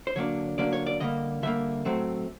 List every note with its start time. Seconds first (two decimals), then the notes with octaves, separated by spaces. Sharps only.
0.07 C5
0.16 D3 F#3 A#3 D4 C#5
0.58 D3 F#3 A#3 D4 D5
0.73 C#5
0.87 D5
1.00 D3 G3 A#3 D#5
1.43 D3 G3 A#3 E5
1.85 A2 F#3 A3 C4